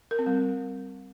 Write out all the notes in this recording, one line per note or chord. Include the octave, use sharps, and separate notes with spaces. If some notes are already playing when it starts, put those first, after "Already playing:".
A#4
C4
G3